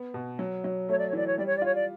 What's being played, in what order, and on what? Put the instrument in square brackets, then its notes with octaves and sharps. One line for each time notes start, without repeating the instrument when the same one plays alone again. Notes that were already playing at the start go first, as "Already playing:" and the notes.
Already playing: [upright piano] B3
B2
F#3
F#3
[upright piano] A3 [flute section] C#5
[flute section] D5
C#5
[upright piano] E3 [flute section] D5
[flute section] C#5
[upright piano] G3 [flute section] D5
[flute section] C#5
D5
[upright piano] F4 [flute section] C#5
[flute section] D5